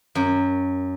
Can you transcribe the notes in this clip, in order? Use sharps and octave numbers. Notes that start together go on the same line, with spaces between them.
F#2